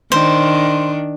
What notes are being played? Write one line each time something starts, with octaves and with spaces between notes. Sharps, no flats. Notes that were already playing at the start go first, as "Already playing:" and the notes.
D#3 D4 C5